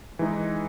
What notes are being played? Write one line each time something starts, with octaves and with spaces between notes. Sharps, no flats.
E3 G#3 D#4